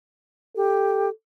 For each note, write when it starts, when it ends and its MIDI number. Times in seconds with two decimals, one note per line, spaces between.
0.56 1.09 67
0.56 1.10 69